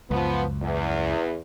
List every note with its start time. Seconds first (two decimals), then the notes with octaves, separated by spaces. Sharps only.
0.10 C#2 F#2 F3 B3
0.62 E2